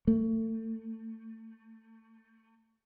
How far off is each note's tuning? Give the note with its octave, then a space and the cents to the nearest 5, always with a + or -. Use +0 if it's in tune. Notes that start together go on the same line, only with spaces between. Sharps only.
A3 +30